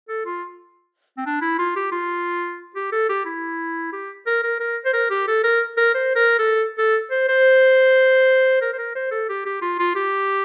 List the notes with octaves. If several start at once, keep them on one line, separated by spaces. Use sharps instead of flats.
A4
F4
C4
D4
E4
F4
G4
F4
G4
A4
G4
E4
G4
A#4
A#4
A#4
C5
A#4
G4
A4
A#4
A#4
C5
A#4
A4
A4
C5
C5
A#4
C5
A#4
C5
A4
G4
G4
F4
F4
G4